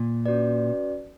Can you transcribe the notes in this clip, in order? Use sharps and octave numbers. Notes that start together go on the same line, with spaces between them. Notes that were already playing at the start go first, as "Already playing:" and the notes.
Already playing: A#2
C#4 F#4 B4 D5